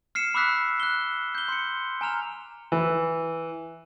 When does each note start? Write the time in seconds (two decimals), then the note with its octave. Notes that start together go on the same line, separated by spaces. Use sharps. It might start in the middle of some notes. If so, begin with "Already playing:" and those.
0.15 F6 C7 C#7 E7
0.34 B5 D6 E6 F#6 B6
0.80 F#6 G7
1.35 G6 G7
1.48 C6 C#7
2.01 G#5 A#5 F6 F7
2.72 E3